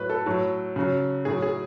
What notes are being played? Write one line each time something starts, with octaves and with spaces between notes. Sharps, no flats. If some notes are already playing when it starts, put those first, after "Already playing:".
Already playing: A2 F#3 B4
A4
A2 F#3
C#3 F#3
A2 F#3 G#4
G#4